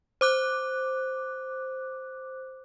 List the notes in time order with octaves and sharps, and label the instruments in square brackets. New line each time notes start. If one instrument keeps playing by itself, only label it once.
[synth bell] C5 D6 F#6